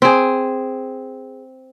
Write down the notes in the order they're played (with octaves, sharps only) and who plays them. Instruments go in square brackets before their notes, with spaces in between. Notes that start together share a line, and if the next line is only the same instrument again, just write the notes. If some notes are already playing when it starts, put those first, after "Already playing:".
[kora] C4 G#4